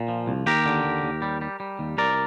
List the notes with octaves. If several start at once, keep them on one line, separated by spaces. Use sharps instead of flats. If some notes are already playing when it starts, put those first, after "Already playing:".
Already playing: A#2
F3
C2
D#2 G4 A#4
D3
D#2
D#2
G3
G3
G3
D#2
C2 A#4 D5